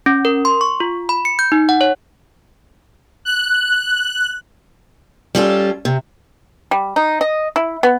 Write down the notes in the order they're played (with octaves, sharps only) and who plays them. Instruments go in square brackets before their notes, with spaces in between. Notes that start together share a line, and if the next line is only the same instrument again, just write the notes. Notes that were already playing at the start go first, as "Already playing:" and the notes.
[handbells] C#4
A#4
C6
C#6
F4
B5
C#7
G6
D#4
F#5
C#5
[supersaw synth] F#6
[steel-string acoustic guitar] G3 C#4 F4 A4
C3
[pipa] G3
D#4
D#5
E4
B3